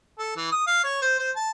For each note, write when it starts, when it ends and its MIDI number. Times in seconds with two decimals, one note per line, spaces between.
0.18 0.32 69
0.36 0.48 52
0.51 0.66 87
0.67 0.83 77
0.84 0.99 73
1.02 1.15 72
1.19 1.30 72
1.36 1.50 81